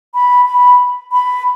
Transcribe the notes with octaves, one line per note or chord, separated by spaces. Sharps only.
B5
B5
B5